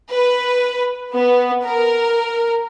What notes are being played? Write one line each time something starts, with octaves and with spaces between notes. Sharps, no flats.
B4
B3
A#4